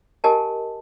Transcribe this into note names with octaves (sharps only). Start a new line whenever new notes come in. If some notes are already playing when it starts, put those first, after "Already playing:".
G4 A#4 D#5 G#5 A5